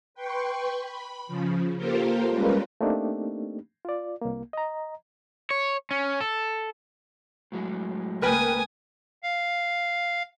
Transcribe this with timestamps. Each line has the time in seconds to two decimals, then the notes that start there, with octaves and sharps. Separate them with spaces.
0.14 B4 G5 C6 C#6
0.82 B5
1.27 C#3 F3
1.76 A#3 F4 G4 A4 A#4 C5
2.29 G3 G#3 C#4 F4 A#4 B4
2.81 A3 A#3 C4 D4 D#4 G4
3.85 F4 D5
4.22 C2 A#3
4.53 D#5 A#5
5.51 C#5
5.91 C#4
6.21 A4
7.52 A2 F#3 G#3
8.22 C#2 A3 A#3 A#4 B4 G5 G#5 D#6
9.23 F5